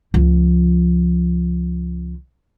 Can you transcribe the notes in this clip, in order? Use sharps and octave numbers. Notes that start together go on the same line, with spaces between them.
C#2 F3